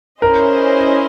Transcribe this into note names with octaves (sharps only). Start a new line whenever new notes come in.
C#4 E4 G#4 A#4 C5 D#5